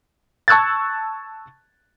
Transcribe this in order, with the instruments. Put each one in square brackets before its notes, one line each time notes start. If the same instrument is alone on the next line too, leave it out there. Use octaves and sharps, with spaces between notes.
[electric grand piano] A5 C#6 E6 F#6 G#6 A6